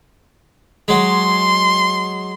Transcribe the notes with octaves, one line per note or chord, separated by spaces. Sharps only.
F#3 G#3 C6